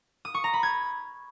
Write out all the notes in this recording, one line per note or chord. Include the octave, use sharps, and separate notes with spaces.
D#6
C#6
A#5
B5
G#6